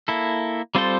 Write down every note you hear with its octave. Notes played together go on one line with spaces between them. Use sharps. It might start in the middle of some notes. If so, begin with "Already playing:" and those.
A#3 E4 A4
G3 C4 F4 A4 C5